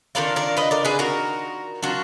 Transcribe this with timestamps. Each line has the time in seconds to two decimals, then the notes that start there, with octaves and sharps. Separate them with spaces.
0.15 D#3 G#3 D4 F4 A#4 D5
0.36 A#4 D5
0.57 B4 D#5
0.71 A#4 D5
0.85 G#4 B4
0.99 F#4 A#4
1.83 F#3 D4 F4 F#4